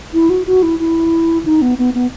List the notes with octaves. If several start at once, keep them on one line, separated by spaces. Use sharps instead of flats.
E4
F#4
F#4
E4
E4
D#4
B3
B3
B3